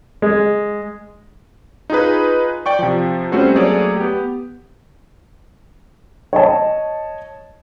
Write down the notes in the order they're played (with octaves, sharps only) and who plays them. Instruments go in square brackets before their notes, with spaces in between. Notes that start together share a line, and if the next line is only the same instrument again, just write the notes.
[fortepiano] G#3
[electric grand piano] D#4 F4 G#4 B4
D5 G5 C#6
C3 F3
G3 A3 C4 C#4 F#4 C5
F#3 A3 A#3 G#4 C#5 D5
B3 G4
[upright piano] C#5 D#5 A5